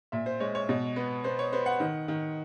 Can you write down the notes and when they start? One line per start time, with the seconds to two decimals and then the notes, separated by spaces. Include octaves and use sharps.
0.12 A#2 E5
0.26 C5
0.40 G#3 C#5
0.55 C#5
0.69 B2
0.96 B3
1.24 B3 C5
1.39 C#5
1.52 B3 C5
1.66 F#5
1.80 D#3
2.08 D#3